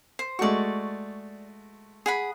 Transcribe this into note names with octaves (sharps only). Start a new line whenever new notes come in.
C5
G#3 A3 F#4 D5 C#6
G#4 F#5 B5